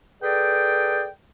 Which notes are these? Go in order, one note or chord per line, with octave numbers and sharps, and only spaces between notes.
G#4 A4 B4 D5 G5